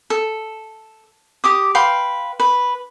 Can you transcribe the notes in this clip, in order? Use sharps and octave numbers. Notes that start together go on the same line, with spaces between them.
A4
G4 D6 D#6
B4 F5 G5 C6
B4